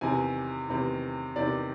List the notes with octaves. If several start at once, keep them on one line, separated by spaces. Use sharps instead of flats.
E2 C3 D#3 G#5
E2 C3 D#3
E2 C3 D#3 D5